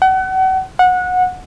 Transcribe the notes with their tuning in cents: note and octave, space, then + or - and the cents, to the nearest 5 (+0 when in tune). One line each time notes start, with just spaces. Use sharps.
F#5 +35
F#5 -20